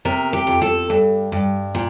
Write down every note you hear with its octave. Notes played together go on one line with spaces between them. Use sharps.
C3 A#4
G4
F2
A4
G2
G2
A#2